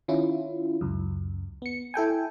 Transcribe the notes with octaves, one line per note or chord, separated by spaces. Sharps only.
D#3 C#4 E4 F4
C#2 F#2
B3 C#7
E4 A4 G5 G#5